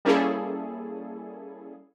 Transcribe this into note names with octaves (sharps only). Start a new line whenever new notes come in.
G3 A#3 C#4 E4 G#4 A4